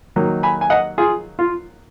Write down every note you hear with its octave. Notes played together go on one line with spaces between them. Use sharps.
D#3 F#3 A#3 D#4
G#5 B5
G#5
D#5 F#5
F4 G#4
F4